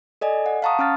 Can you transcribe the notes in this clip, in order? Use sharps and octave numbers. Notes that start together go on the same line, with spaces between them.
A4 D5 D#5 G#5
F#5
F5 F#5 A5 A#5 C#6 D#6
C#4 C#6 F6 A6